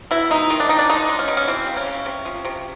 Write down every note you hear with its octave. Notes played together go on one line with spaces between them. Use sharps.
B2 E4
G#3 D#4
D#3
D4
D#3 D#4
D4
G#3 D#4
G#3
C#4
B2
C#4
E3 C4
C#3
C#4
C#3
C3
F3
C3